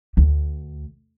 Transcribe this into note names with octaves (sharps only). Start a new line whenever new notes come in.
D2